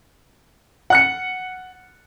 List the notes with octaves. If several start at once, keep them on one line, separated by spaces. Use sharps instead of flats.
F#5 F#6 C#7